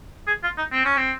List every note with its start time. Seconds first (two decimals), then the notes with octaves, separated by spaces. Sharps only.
0.27 G#4
0.43 F4
0.58 D#4
0.72 C4
0.85 C#4
0.97 C4